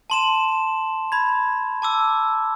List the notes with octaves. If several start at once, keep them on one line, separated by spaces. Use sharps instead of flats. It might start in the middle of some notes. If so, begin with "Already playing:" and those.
A5 C6 E7
B5 G#6
A5 D6 E6